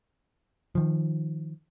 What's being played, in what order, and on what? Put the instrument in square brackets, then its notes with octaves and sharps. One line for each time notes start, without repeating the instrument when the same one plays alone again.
[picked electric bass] D#3 F3